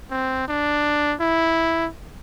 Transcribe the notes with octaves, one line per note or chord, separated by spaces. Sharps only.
C4
D4
E4